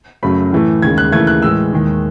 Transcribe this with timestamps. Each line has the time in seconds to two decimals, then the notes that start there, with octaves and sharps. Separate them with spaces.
0.23 F#2 C#3 F#3 A3 B5
0.52 A2 E3 A3
0.82 D#2 C#3 G#3 G#6
0.98 F#6
1.12 D#2 C#3 E3 A3 G#6
1.27 F#6
1.42 A2 E3 G#3 E6
1.72 D#2 D#3 G#3